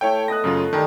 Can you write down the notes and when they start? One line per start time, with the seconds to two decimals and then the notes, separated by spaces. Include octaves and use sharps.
0.01 A3 E4 C#5 G5
0.28 B3 D#5 A5 F#6 A#6
0.44 F#2 C#3 F4
0.73 D#3 G3 D#4 A4